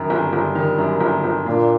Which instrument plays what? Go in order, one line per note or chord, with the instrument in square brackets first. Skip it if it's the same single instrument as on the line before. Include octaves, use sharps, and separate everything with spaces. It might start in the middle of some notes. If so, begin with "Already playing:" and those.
Already playing: [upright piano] F#2 D#3
[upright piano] G1 [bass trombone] G3
[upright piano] G1
D#3
F#2
G1
G1
[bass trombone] A#2 [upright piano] D4